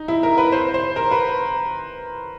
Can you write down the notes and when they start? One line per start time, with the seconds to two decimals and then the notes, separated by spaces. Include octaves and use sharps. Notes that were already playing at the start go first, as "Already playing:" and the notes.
Already playing: D#4
0.08 E4
0.23 A#4
0.38 B4
0.52 C5
0.74 C5
0.96 A#4
1.11 B4